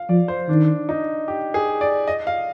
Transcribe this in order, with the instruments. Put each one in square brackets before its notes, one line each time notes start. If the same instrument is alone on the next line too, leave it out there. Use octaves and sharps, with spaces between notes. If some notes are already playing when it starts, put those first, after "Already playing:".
Already playing: [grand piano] F5
[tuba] F3 [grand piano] D5
[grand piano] C5
[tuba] D#3 [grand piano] D4
[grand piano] D#4
G4
G#4
D5
D#5
F5